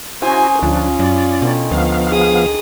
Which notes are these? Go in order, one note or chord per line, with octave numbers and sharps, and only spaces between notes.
C#3 E4 F#4 G#4 C5 G#5
D2 F3 C#4 D4 F4
F#2 D5
B2 D3 D#3
D2 F3 B3 F5
G#4 D#6